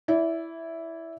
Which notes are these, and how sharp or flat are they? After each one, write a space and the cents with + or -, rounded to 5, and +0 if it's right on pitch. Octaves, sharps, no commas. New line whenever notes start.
E4 +0 D5 -30